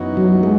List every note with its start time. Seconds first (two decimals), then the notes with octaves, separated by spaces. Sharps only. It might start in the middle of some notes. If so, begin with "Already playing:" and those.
Already playing: F#2 E3 B3 D#4 F#4
0.17 F#3
0.43 G#3